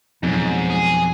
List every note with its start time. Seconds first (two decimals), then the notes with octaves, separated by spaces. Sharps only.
0.23 F2 G#2 B2 F#3
0.70 G#4